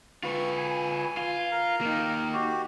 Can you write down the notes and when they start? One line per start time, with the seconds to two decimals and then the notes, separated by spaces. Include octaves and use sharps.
0.23 F4 B4 C#6
0.58 G#5
1.17 F4
1.51 A#4
1.81 A#3 D#4
2.33 F#4 G4